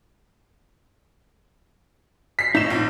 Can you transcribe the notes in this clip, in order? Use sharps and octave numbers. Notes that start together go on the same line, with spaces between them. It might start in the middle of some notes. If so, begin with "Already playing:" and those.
B6 C7
A2 D#4 E7
A#1